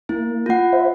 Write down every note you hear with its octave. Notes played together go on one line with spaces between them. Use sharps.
A#3 E4
F4 F#5
C5 E5